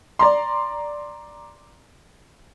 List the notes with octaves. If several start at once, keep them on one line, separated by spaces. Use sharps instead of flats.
D5 A#5 C6